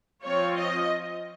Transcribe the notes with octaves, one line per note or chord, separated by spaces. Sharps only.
F3 C4 F4 C#5
D#5